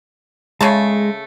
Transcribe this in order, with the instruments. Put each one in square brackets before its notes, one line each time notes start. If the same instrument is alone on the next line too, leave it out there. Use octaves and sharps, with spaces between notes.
[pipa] C#3 A3 A5 [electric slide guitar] G#3